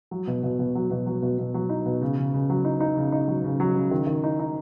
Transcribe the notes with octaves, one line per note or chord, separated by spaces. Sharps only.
F#3
B2
B2
B2
F#3
B2
F#3
B2
B2
F#3
D#4
B2
C#3
C#3
C#3
F#3
D#4
D#4
C#3
D#4
F#3
C#3
F#3
C#3
D#3
D#3
D#4
D#4